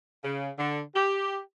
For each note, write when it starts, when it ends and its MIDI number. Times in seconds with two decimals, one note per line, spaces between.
0.23 0.50 49
0.58 0.81 50
0.95 1.40 67